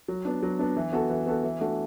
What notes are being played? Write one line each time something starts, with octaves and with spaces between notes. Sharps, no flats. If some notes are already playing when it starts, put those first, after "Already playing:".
F#3
B3 D4
F#3
B3 D4
E3
B3 F#4 A4
E3
B3 F#4 A4
E3
A3 D4 F#4